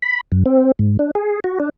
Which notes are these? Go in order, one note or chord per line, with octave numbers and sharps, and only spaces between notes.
B5
F#2
C4
G#2
D4
G#4
F#4
D4